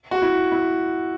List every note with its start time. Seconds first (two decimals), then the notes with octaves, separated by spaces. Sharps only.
0.11 F#4
0.22 E4
0.52 E4